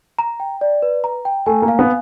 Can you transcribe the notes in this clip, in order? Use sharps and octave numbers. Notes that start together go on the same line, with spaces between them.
A#5
G5
D5
B4
A#5
G5
A3 G#5
A#3
F5
B3